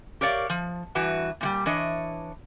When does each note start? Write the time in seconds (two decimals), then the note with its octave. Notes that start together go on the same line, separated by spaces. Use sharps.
0.21 G4 A#4 C#5 D5 F5
0.50 F3
0.95 G2 E3 F#4 B4
1.41 A#2 F3 G3
1.66 E3 D4 C#5 D#5